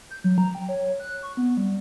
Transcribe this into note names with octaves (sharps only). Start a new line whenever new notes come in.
G6
F#3
A#5
G5
C#5
F#6
C#6
B3
G3